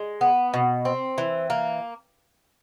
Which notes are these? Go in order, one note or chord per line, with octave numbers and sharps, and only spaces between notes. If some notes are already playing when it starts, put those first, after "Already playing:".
Already playing: G#3
B3
B2
C4
E3
A#3